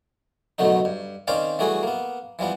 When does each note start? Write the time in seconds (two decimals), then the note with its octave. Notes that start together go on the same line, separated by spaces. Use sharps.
0.58 F#2 B2 D3 F#3 A3 D#4
0.85 G2
1.27 D#3 C4 C#4 C5 D5 F5
1.59 E3 G3 A3 F#4 G#4
1.83 A#3 B3
2.39 E3 F3 G3 B3